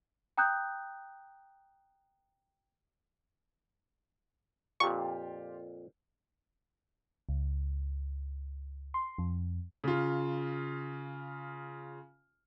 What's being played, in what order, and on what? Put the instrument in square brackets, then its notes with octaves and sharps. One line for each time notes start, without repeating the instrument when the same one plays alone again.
[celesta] G5 A#5 D#6 F#6 G6
[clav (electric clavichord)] F2 A#2 [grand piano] F4 G4 [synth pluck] C#6
[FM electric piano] C#2
C6
F2
[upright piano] C#3 F4